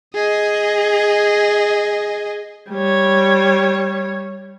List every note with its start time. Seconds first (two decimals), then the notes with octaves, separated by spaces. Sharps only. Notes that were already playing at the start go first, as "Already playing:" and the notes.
0.15 G#4 D#5
2.71 G3 C#5